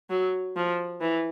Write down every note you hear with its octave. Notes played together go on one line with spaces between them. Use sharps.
F#3
F3
E3